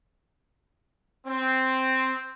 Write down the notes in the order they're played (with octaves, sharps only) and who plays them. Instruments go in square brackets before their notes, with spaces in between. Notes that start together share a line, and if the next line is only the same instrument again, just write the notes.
[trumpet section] C4